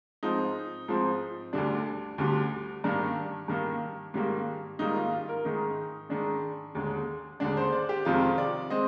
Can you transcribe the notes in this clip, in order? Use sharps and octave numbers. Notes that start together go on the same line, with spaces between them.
G#2 F3 C4 D#4
G#2 F3 C4
D2 D3 G3 D4
D2 D3 G3
G2 D#3 A#3 D4
G2 D#3 A#3
G#2 D#3 G3 A#3
G#2 D#3 G3 A#3 D#4
F4
F4
A#4
G#2 D#3 G#3 D#4
G#2 D#3 G#3 D4
D#2 D3 G#3
D#2 D3 G#3 D4
C5
D5
G4
F2 C3 D#3 G#3 C4 F4
D5
G#3 C4 D#5